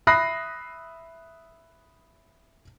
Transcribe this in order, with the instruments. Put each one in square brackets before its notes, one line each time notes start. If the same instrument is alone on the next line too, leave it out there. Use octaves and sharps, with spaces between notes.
[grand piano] E5 B5 D#6 F#6 A#6 C7